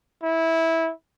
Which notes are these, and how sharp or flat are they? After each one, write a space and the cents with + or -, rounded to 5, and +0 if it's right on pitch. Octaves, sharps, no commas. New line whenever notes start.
E4 -15